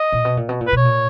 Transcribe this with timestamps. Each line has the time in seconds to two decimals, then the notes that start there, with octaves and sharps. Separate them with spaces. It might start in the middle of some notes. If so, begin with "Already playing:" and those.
Already playing: D#5
0.12 A#2
0.25 B2
0.37 A#2
0.49 B2
0.61 A#2
0.67 B4
0.73 B2 C#5
0.85 A#2